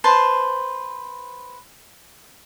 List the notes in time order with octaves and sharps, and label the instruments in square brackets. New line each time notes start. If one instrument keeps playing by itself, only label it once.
[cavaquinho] B4 C5 A5